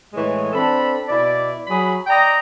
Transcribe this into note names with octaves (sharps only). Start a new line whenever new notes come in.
A2 E3 G#3 C#5
C4 D4 A4 B5
B2 E4 D5
F#3 G#4 B5
D5 D#5 G5 A#5